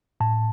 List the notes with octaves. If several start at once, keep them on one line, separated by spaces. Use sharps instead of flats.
A2 A5